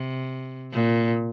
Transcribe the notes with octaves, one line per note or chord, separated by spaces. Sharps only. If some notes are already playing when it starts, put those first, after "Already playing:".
Already playing: C3
A#2